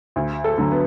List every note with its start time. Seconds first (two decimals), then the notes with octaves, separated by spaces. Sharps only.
0.16 D2
0.44 A4
0.58 D3 F#3
0.71 B3